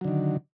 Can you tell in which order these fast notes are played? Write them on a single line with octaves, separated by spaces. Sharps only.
F#3 D3 D#3